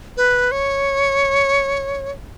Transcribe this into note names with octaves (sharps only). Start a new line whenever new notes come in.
B4
C#5